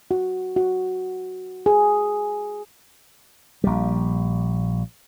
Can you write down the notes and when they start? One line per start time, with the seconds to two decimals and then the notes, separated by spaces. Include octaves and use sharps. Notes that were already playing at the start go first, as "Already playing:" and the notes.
0.11 F#4
0.56 F#4
1.66 G#4
3.64 A#1 G3